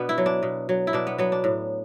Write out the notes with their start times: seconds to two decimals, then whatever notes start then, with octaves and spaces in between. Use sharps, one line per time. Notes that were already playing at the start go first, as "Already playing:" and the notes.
Already playing: B2 B3 D4
0.09 E4
0.18 F#3
0.26 D4
0.43 B2
0.69 F#3
0.87 E4
0.93 B2 D4
1.07 B3
1.18 F#3 B3
1.32 D4
1.44 A2